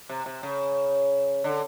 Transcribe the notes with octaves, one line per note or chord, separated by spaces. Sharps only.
C3
C3
C#3
D3